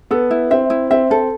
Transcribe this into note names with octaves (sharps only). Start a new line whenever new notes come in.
B3 A4
E4
C4 E5
E4
C4 E5
C4 A4